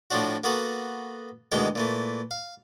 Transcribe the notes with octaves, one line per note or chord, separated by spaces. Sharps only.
A2 F3 C4 D4 F#4
A#3 B3 F#4 A4
D2 B2 D#3 E3 G#3 G5
A#2 E3 A3
F5